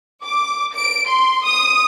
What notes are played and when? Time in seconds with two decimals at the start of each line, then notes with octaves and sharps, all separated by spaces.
0.23 D6
0.74 D7
1.07 C6
1.45 D#6